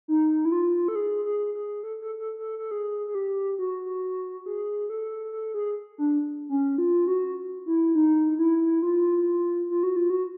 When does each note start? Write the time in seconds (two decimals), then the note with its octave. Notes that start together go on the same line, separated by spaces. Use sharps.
0.08 D#4
0.45 E4
0.52 F4
0.88 A4
0.95 G#4
1.25 G#4
1.55 G#4
1.83 A4
2.02 A4
2.19 A4
2.39 A4
2.59 A4
2.71 G#4
3.08 G#4
3.15 G4
3.59 F#4
4.46 G#4
4.90 A4
5.32 A4
5.54 G#4
5.98 D4
6.49 C#4
6.78 F4
7.07 F#4
7.66 E4
7.95 D#4
8.39 E4
8.82 F4
9.70 F4
9.83 F#4
9.96 F4
10.10 F#4